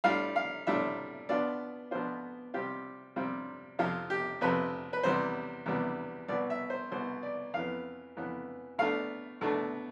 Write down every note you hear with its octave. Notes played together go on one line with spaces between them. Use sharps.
A2 G3 D4 F4 F5
F5
A2 G3 D4 F4 E5
B2 B3 D4 F4 D5
B2 B3 D4 F4 C5
C3 G3 C4 F4 G4
C3 G3 C4 F4
F2 C3 F3 F4
G4
F2 C3 F3 B4
B4
E2 C3 G3 B3 C5
E2 C3 G3 B3
C2 B2 B3 D5
E5
C5
C2 B2 B3 C5
D5
F2 E3 B3 F5
F2 E3 B3
B2 A3 D4 F5
B2 A3 D4